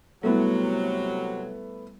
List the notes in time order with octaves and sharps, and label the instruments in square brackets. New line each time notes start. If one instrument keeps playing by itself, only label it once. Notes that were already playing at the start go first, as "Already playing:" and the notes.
[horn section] C3 F#3 [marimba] G3 E4 [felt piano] A3 B3